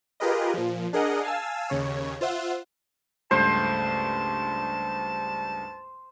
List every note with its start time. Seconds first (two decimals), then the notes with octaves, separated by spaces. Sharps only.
0.20 F4 G4 G#4 A#4 B4 D#5
0.54 A#2 F3
0.93 D4 G#4 A#4 D#5 F#5
1.23 F5 G#5 A5 E6
1.70 D#2 C#3 C#5
2.21 F4 C5 E5 F#5
3.31 C#2 G2 A3 C5 A5